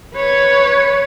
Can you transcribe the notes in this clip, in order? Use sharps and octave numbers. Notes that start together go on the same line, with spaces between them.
B4 C#5